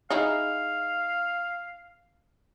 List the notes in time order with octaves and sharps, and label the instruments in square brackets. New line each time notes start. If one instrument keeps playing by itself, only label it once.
[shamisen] D#4 E4 G#4 [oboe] F5